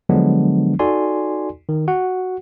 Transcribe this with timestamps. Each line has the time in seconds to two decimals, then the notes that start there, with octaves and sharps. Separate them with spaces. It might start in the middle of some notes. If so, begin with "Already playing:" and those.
0.09 D3 F3 F#3 G#3 B3 D4
0.79 D#4 F#4 A4 D5 G#5 C6
1.69 D#3
1.88 F#4 F#5